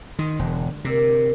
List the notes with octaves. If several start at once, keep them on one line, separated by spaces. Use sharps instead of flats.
D#3 C6 D#6 C7
E1 D3 G#3
C3 A#3 D5 E6